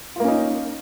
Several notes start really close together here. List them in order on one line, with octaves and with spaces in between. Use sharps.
F4 A#3 C#4 D#4